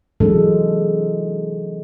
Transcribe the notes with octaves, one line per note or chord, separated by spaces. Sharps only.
C3 E3 F#3 G#3 D4 A4